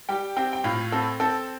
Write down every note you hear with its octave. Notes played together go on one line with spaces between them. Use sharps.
G3 G4 G5
C4 G4 G5
G5
A2 F4 F5
C4 A4
C4 A4